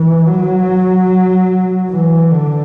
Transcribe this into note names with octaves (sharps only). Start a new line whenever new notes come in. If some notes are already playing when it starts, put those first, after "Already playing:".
Already playing: E3
F#3
E3
D3